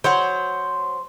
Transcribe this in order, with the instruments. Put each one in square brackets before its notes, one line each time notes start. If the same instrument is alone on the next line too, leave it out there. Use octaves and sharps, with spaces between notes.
[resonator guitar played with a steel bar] F#3 C#5 F#5 [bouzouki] C5